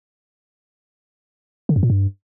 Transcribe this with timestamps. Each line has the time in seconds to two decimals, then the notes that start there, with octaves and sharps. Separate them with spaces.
1.69 D3
1.76 F#2
1.83 A#2
1.90 G2